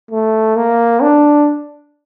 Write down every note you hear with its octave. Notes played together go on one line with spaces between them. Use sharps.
A3
A#3
D4